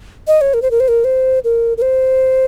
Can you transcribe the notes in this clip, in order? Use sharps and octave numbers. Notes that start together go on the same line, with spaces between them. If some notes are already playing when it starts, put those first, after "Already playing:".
D#5
C#5
A#4
C5
A#4
C5
A#4
C5
A#4
A#4
C5